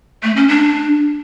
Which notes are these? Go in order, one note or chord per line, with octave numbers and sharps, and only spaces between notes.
A3
C#4
D4